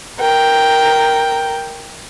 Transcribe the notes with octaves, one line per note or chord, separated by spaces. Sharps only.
A#4 G5